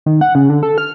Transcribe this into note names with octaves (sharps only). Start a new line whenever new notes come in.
D#3
F#5
C#3
D3
A4
F6